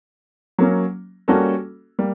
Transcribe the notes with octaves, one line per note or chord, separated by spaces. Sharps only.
F#3 A#3 C#4
G3 A#3 C#4 F#4 A4
G3 A#3